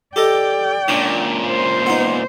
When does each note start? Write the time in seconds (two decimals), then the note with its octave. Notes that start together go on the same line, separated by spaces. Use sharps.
0.16 G4 A4 D5 D#5 G5
0.88 C#2 A#2 C#4 D4
1.47 C5
1.86 B3 D#4